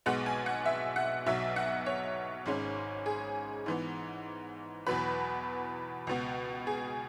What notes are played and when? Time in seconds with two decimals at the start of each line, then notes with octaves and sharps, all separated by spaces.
0.06 B1 B2 G#3 B3 F#5
0.26 G#5
0.46 F#5
0.66 E5
0.96 F#5
1.26 B1 B2 F#3 E5
1.56 F#5
1.86 C#5
2.46 G#1 G#2 G#3 C#4
3.06 G#4
3.66 G#2 E3 B3
4.87 E2 B2 F#3 B4
6.07 C#2 B2 B3
6.67 G#4